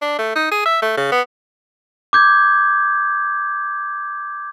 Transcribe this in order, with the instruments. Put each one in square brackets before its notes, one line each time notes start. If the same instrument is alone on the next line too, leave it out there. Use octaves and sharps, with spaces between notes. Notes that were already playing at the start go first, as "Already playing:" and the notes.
[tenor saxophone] D4
A3
D#4
G#4
E5
A3
C#3
B3
[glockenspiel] D6 G6 G#6